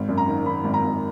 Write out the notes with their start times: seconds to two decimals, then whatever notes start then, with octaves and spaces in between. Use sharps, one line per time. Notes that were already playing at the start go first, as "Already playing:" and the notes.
Already playing: G#1
0.09 F#2
0.18 A#5
0.28 D#3
0.46 D#3 B5
0.64 G#1
0.74 A#5
0.83 G#1